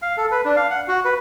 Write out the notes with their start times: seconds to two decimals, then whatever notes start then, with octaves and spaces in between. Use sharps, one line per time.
0.02 F5
0.17 A4
0.31 B4
0.45 D4
0.56 F5
0.70 F#5
0.88 F#4
1.05 B4